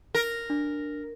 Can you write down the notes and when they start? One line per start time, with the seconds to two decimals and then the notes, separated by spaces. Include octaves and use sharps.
0.15 A#4
0.50 D4